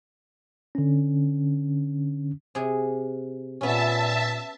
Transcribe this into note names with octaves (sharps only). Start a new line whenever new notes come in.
D3 C#4
C3 G#4
A#2 B3 C#4 E5 A5